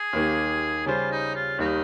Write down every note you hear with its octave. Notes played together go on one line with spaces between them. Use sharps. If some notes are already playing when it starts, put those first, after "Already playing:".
Already playing: G#4
D#2 D#3 A#3 D#4 G4
C#3 G3 C#4 F4 G4 C5
D#4
F4
D#2 D#3 G3 D#4